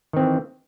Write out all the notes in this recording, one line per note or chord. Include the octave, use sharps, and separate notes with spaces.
D#3 E3 C4